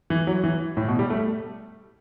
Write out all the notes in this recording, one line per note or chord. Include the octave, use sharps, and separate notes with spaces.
E3
F#3
E3
A2
B2
G3
A3